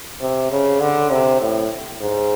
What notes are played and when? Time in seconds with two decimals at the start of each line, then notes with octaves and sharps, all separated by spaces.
0.21 C3
0.51 C#3
0.81 D3
1.10 C3
1.41 A2
2.01 G#2